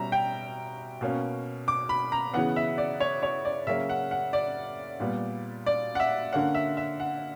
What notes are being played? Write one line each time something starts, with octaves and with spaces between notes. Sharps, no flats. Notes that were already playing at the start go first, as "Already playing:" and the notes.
Already playing: B2 G3 C#4 E5 A#5
G5
B2 A#3 C#4
D6
B5
A#5
C#3 E3 B3 F#5
E5
D5
C#5
C#5
D5
C#3 F#3 A#3 C#4 E5
F#5
F#5
D5
A#2 G3 B3
D5
F#5
E5
D3 A#3 C#4 F#5
E5
E5
F#5